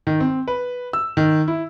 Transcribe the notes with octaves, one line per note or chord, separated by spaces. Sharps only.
D#3
C4
B4
E6
D#3
E4